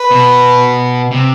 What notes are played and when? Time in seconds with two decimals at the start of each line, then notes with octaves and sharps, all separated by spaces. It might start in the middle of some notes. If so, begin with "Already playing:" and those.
Already playing: B4
0.11 B2
1.11 C3